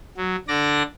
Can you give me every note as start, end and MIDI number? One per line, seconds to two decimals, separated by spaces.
0.17 0.36 54
0.48 0.83 50
0.48 0.83 62
0.48 0.83 74
0.48 0.83 94